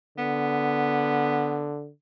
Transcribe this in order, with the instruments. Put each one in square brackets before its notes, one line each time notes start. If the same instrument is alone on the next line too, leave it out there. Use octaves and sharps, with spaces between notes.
[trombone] D3 [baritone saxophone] B3